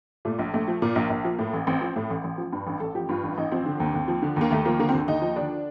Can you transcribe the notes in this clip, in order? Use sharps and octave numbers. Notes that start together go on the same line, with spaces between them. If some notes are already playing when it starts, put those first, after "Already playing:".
A#2 A3
A#1
A#1 A3
F3
A#2 A#3
A#1
A#1
F3
A2
A1
A1 C4
F3
A2
A1
A1
F3
G2
A1
A1 A4
F3 G4
G2 F4
A1
A1 D#4
F3 C4
D3
D#2
D#2
F3
D3
D#2 A#3
D#2 A3
F3 A#3
D3 A#3
C4
D#2
D#2 D#4
F3
D3 D4